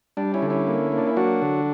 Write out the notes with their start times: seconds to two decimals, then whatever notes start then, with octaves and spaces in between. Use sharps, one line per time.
0.17 G3 D4
0.34 C#4 E4
0.42 D3
0.50 C#4 E4
0.67 A#3
0.92 A#3
0.98 D4
1.07 E4
1.17 F#3 D4 F#4
1.42 D3